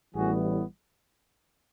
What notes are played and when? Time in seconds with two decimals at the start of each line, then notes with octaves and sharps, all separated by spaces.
0.14 A1 A2 E3 G3 B3 F#4 G#4